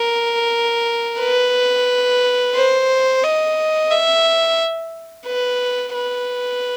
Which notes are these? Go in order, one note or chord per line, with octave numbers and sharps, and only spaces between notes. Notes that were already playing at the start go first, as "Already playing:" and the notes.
Already playing: A#4
B4
C5
D#5
E5
B4
B4